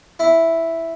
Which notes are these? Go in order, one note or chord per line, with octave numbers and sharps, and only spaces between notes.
E4